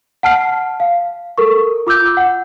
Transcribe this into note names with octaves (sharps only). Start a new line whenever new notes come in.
F#5 A5 F6 C7
F5
A4 A#4 C#6
F4 D6 E6 G6
F#5